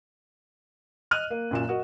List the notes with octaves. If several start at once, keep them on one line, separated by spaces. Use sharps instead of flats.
D#5 F6 F#6 D#7
A#3
F#2 A#2 E7
F#4 A#4 D#5